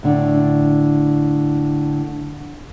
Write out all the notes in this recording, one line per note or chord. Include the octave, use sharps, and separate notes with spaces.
A2 D3